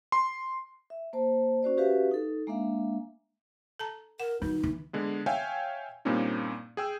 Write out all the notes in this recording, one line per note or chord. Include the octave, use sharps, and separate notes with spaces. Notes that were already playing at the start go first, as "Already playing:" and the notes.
C6
E5
A#3 C5 A5
C#4 F#4 C5 D5
C#4 F#4 G4 B4 E5 F5
D#4 A4
G#3 A#3 D4 E5 F5
A4 A5 A#5
A#4 F#5
D3 F#3 D#4
E3
D3 G#3 B3
C#5 E5 F5 G5 G#5
G2 A#2 A#3 C4 C#4 D#4
G#4 G5 E6